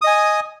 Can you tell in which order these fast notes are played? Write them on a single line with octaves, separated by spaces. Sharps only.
D#6 D#5 G#5